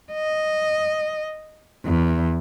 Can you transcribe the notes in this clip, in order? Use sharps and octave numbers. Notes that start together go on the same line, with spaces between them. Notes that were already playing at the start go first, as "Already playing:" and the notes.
D#5
E2